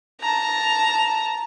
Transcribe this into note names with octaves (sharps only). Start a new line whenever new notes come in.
A5 A#5